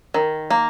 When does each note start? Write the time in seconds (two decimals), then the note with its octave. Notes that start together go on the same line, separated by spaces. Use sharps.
0.14 D#3
0.50 A#3